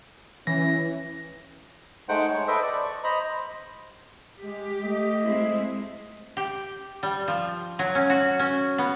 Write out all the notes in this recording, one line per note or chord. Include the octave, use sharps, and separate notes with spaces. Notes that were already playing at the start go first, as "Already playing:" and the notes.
E3 C#4 A#6
G#3 A3 D#4 C5 F#5 G5
C#5
A4 B4 C5 D#5 E5 G5
D5
C#6
C5 D#5 A#5 B5
G#3 G4
A3 D#5
G#3 C4 E4
G4
G3
F3
F#3
C#4
F#4
C#4
B3